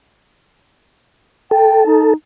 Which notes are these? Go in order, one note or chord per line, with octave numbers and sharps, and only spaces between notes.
A4 G5
D#4